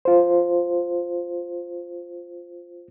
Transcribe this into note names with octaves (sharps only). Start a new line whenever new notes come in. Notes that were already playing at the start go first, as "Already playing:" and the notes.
F4 C5